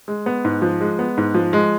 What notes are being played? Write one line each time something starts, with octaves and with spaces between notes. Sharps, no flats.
G#3
B3
G#2
F3
G#3
B3
G#2
F3
G#3